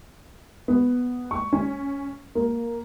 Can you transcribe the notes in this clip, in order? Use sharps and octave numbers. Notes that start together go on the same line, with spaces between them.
B3
C#6
C#4
A#3